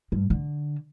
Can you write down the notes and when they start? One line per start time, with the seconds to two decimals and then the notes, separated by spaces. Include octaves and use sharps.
0.12 G2
0.30 D3